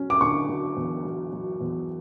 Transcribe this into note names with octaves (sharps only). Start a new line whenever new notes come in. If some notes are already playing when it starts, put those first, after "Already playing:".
Already playing: F#3 C#4
D6
D3 C#6
F#3
E2
F#3
F#3
E2